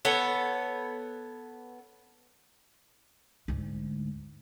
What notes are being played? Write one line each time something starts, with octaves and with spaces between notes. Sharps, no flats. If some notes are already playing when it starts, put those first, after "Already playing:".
B3 A4 C#5
D2 G#2